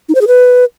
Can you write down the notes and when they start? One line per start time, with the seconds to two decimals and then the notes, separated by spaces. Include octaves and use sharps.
0.09 D#4
0.15 C5
0.21 G#4
0.27 B4